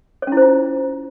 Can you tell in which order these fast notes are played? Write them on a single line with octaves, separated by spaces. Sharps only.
C#5 C#4 E4 C5 F4